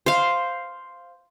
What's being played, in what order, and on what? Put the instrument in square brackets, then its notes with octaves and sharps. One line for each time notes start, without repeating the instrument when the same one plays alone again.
[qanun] C5 F5